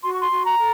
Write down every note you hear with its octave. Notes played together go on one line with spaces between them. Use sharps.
F#4 C6
C#6
C6
F#4
A#5
A4